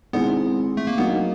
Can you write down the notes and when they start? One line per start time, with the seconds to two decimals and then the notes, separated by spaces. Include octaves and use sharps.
0.13 D#3 G#3 B3 C4 E4 G#4
0.77 A3
0.87 A#3
0.98 F#3 A#3 B3 D#4 F#4